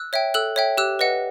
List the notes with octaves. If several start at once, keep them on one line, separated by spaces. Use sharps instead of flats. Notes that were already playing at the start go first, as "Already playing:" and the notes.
Already playing: E6 F#6
C#5 E5 G5
A4 E6 F#6
C#5 E5 G5
G4 E6 F#6
B4 D#5 F#5